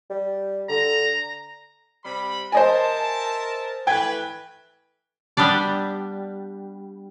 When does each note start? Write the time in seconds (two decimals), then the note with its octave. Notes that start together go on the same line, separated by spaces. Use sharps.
0.10 G3
0.69 D3 A#5
2.04 C3 G3 B5
2.52 A#4 C5 D#5 E5 G#5 A5
3.87 E3 A3 B4 G5 G#6
5.37 G3 B3 D4 D5